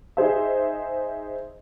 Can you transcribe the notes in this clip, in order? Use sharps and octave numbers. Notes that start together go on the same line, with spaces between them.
D#4 G#4 C5 E5